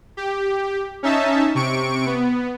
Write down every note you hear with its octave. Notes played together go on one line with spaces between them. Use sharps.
G4
C#4 D#4 E5 A5
C3 C#6 D7
B3